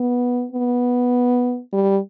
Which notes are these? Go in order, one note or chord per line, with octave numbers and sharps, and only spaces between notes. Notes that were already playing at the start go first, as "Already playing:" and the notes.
Already playing: B3
B3
G3